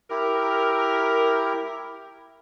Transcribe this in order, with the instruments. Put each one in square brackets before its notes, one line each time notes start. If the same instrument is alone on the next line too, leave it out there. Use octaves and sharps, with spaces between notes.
[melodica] E4 G4 [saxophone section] A#4